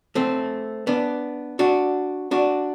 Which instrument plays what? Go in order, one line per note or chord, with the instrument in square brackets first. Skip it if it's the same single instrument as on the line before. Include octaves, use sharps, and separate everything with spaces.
[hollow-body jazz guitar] A3 C4
B3 D4
D4 F#4
D4 F#4